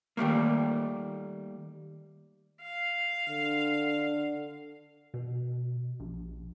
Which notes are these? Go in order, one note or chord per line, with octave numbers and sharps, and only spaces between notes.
D#3 G3 A3 A#3
F5
D3
B2
A#1